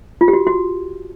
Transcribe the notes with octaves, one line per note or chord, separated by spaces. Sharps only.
F4
G4
F#4
F#4